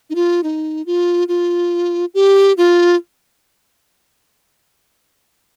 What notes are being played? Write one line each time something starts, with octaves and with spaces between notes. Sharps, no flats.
D#4
F4
D#4
F4
F4
G4
F4